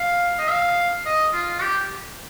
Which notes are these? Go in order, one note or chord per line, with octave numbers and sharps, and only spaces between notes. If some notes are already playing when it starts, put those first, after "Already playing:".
Already playing: F5
D#5
F5
D#5
F4
G4